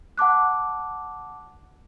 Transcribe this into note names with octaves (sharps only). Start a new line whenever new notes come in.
F#5 A5 D6 F#6